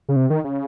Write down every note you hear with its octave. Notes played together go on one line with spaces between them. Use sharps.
C#3
C3
D#3
C#3